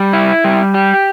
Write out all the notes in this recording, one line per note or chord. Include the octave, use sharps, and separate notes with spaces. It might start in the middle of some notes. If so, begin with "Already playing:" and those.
Already playing: G3
E4
G3
G4